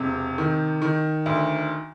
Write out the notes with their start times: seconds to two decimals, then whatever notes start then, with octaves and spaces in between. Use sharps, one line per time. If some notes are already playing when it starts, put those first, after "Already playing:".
Already playing: E1 C3
0.38 D#3
0.82 D#3
1.26 D2